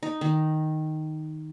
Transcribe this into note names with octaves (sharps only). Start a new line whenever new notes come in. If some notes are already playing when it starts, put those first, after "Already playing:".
D#4
D#3